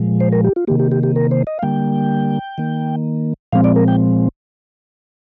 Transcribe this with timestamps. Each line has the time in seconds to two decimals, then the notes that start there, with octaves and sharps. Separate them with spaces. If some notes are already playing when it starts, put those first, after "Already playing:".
Already playing: A#2 F3 G#3
0.20 C5
0.32 A#4
0.44 G4
0.56 F4
0.67 C3 D#3 A#3 G4
0.79 G4
0.92 G4
1.03 G4
1.16 A#4
1.31 C5
1.47 D#5
1.59 F5
1.62 D3 G3 A#3 G5
2.58 D#3 A#3
3.53 A#2 F3 G#3 C4 F5
3.64 D5
3.76 A#4
3.88 G5